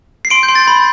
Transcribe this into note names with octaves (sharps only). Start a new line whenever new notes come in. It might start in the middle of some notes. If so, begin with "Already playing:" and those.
C7
C6 D7
G6
C6
A6
B5